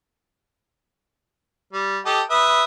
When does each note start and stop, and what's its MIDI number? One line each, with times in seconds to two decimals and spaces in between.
1.73 1.98 55
2.05 2.21 67
2.05 2.21 69
2.05 2.21 75
2.30 2.64 71
2.30 2.64 76
2.30 2.64 87